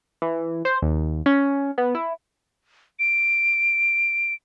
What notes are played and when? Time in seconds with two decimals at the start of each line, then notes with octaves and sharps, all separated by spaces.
0.22 E3
0.65 C5
0.82 D#2
1.26 C#4
1.78 B3
1.95 E4
2.99 D7